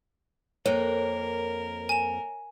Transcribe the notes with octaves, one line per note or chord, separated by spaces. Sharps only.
F2 A#3 A#4 C#5
G#5 E7